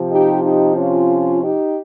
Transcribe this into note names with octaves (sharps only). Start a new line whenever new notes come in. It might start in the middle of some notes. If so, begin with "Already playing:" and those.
Already playing: C3 F3
D#4 G4
D#4 G4
C#4 F4
D#4 G4